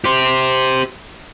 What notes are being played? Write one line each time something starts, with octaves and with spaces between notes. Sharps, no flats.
G4 C5